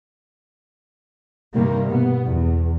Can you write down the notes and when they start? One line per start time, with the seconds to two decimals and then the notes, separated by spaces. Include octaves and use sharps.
1.54 G2 C3 D#3 G3 A#3
1.87 B2 B3
2.26 E2